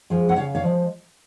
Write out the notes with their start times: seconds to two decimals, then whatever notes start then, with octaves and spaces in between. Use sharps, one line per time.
0.10 F3 G#3
0.29 F#5
0.36 C#3 C#5 F5
0.55 C#5 F5
0.63 F3 G#3